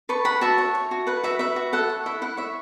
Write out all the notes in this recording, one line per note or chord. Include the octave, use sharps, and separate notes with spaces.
B4 A5 C#6
B4 F#5 B5
F#4 E5 A5
C#5
C#5
F#4
B4 F#5
F#4 E5
B4 E5
F#4
A4 F#5
C#5
E4 E5
E4 F#5
C#5 E5